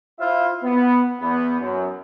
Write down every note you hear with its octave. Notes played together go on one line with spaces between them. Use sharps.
E4 F4 C5 E5 F5
B3
E2 B3
F#2